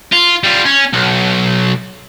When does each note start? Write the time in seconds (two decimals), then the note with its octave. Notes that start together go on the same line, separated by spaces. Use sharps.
0.13 F4
0.44 G3 F4
0.65 C#4
0.93 B1